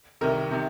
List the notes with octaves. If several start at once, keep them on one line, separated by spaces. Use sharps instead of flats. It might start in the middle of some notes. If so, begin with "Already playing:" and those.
C2 C3 D#3 A#4
C3 D#3